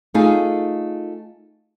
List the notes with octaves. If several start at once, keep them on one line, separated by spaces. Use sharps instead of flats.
A3 D#4 F4 G#4